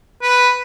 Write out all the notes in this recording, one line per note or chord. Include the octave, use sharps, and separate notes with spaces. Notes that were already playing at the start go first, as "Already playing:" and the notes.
B4